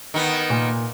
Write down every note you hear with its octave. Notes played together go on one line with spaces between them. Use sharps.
D#3 B3
A#2